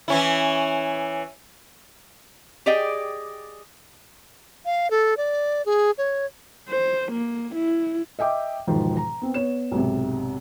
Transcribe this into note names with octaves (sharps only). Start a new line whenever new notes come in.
E3 C#4 E4
G4 G#4 D5 D#5 G5
F5
A4
D5
G#4
C#5
C5
A#3
E4
D#5 E5 G5 D6
E1 G#2 D#3 F3
A#5
B3 C4
B3 C#5 E7
B1 G#2 C3